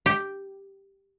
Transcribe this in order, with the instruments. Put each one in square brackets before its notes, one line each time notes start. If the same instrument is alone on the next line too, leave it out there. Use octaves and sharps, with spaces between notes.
[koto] G4